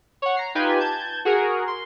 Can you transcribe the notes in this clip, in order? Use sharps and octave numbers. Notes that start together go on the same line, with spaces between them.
C#5 F#5
A#5 C7
D#4 F4 G4 B4 G5 G#5
A5 G6 G#6
F#4 G#4 A#4
C6